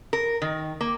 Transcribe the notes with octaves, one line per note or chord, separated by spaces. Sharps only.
A#4
D#3
A#3